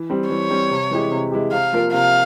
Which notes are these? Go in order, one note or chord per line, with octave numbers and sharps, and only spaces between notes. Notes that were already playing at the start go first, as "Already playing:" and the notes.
Already playing: E3
G3 C4
E3 C#5
G3 C4
C3
E3 G#3 E4 G4
C3
E3 G#3 E4 G4
C3 F5
F3 A#3 F4 A#4
C3 F5